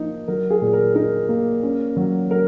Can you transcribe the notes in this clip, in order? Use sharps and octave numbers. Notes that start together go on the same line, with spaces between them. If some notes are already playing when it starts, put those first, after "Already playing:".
Already playing: F3 A#3 D#4
F#3 A#4
G#4
A#2
A#4
D#4 A#4
A#3
C#4
F#3
F#3 A#4